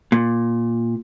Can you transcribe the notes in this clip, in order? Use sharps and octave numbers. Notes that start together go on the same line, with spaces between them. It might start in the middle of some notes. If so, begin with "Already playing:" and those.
A#2